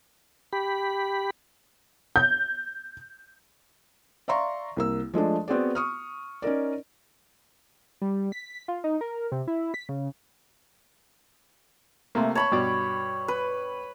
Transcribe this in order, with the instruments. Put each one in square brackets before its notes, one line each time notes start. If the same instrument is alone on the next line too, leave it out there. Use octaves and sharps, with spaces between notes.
[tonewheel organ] G4 B5
[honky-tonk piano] G6
[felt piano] D5 E5 F5 A#5 C6 C#6
C2 A#3 E6
F3 G#3 A3 D4
B3 C4 F#4 G#4 D5
C#6 D#6 F6
C#4 D#4 A#4 D5
[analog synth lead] G3
B6
F4
D#4
A#4
C3
E4
B6
C#3
[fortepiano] C3 A3 A#3
[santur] C#5 B5 C#6 [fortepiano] A5
[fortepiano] G2 B2 D5
[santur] B4